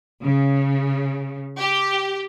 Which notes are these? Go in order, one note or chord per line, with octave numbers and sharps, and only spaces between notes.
C#3
G4